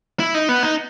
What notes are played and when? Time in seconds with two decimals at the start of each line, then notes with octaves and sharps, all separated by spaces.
0.20 E4
0.34 D#4
0.49 B3
0.63 D#4